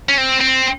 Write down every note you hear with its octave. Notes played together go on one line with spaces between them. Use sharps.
C#4
C4
C4